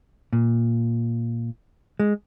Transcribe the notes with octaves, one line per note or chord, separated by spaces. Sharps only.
A#2
G#3